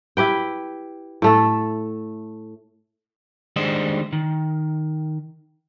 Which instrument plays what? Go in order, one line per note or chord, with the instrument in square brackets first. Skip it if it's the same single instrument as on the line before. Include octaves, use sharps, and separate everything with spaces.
[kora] E4 G4 B4 G5
A2 A3 A4
[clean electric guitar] D#3 G3 G#3 D4 C5 D#5
D#3